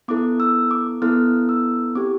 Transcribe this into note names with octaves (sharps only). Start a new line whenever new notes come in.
B3 E4 A4 D6
E6
D6
B3 E4 A4 F6
E6
C4 E4 G4 D6